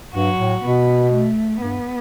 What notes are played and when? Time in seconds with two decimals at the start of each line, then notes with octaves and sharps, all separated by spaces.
0.13 G2 F#3 F#4
0.38 A2
0.62 B2 B3
1.12 A3
1.61 G2 B3